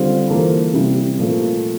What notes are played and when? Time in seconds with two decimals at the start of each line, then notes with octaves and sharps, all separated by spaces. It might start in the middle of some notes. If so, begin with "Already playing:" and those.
Already playing: D3 G3 C4 F4 C5
0.27 E3 A#3 F4 A4 C5
0.73 C3 G3 C4 E4
1.19 A#2 F3 A3